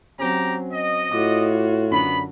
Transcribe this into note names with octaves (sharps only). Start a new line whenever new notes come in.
F#3 C4 C#4 G4 A#5
D#5
A2 F4 F#4 D6
F#2 D3 B3 B5